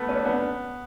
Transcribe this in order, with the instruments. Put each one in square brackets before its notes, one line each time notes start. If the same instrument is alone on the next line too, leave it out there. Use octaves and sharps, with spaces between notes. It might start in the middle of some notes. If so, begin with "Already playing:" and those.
Already playing: [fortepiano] A3 B3
C#4
D4
B3